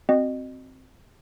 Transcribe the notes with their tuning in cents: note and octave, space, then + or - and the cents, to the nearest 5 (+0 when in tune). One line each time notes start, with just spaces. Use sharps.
C4 +0 F#4 +0 D#5 -30